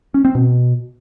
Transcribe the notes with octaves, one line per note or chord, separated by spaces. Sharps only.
C#4
C4
B2